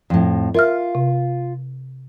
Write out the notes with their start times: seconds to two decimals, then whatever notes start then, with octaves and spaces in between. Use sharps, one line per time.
0.10 F2 A2
0.55 F4 A#4 E5 F6
0.95 C3